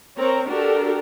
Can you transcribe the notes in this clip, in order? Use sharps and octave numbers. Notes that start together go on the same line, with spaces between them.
C4 A#4 C#5 A#5
D4 F#4 G4 A4 A#4